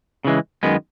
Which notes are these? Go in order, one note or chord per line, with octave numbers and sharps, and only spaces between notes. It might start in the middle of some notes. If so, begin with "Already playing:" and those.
C#3 E3 G#3
F#2 D#3 G#3 B3